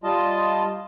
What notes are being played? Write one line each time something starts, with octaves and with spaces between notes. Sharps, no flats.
G3 F4 D#5 A5